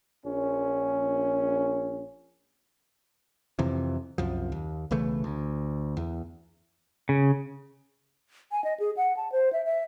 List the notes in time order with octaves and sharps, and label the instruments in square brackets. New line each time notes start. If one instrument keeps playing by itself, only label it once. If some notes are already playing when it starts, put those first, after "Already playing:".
[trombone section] A#1 C#4
[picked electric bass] F2 C3 E3
C2 F#2 F3
D#2
B1 C#3 E3 A3
D2
E2
[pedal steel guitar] C#3
[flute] G#5
D#5
G#4
F#5
A5
C5
E5
E5